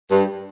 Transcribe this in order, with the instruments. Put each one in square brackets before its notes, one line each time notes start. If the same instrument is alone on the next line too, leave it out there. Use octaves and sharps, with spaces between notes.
[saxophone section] G2